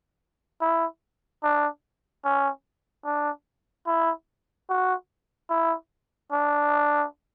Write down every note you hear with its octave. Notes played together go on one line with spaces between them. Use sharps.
E4
D4
C#4
D4
E4
F#4
E4
D4